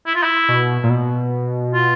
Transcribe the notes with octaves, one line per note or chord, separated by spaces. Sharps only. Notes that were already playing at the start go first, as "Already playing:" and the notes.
E4
F4
E4
B2
A#2
B2
F4